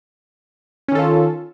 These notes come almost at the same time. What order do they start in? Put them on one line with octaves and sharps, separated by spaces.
C#4 D#3 A4 F4